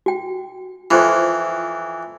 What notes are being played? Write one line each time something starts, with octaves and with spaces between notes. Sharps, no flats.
F#4 G5
F2 E3 F4 C5 C6